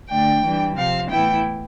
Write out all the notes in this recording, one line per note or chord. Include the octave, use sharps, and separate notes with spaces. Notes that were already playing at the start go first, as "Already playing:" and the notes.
D3 A3 D4 G5
E3 G3 D4
C3 F3 C4 F5
A2 E3 B3 E4 G5